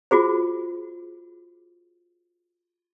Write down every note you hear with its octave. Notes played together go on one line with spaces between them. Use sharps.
F4 F#4 G#4 C5